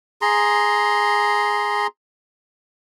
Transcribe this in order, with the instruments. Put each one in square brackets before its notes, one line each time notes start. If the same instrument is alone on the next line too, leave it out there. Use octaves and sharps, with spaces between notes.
[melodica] G#4 A#5 C6